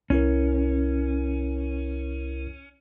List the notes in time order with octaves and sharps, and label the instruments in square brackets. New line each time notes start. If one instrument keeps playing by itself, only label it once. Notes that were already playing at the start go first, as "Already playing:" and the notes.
[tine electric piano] C2 E4 A#4 [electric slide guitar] C#4